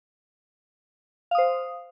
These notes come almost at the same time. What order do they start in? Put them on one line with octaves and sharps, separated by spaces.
F5 D#6 C5